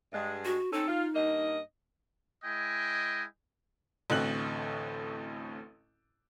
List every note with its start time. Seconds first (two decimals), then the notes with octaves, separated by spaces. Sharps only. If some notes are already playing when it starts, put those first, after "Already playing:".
0.13 G2 G#3
0.45 F#4
0.73 C4 C#4 D#4 A4
0.88 F4
1.15 G2 A#3 D#5
2.44 G#3 E4 D#5 G5 G#5
4.10 A1 D2 A2 C4 F#6 F#7